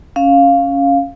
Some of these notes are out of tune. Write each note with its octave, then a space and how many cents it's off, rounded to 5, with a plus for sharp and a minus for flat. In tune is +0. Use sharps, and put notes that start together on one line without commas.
C#4 +0 F5 +0